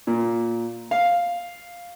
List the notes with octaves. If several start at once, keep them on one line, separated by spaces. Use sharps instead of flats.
A#2
F5